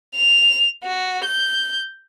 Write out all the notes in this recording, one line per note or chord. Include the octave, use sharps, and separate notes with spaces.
F7
F#4
G6